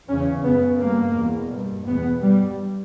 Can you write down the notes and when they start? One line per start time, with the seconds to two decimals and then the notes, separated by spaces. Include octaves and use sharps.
0.09 E2 C#3 C#4
0.45 F#2 C#3 B3
0.80 G2 A#3
1.16 E2 B2
1.52 G2
1.87 E2 B2 B3
2.23 G2 G3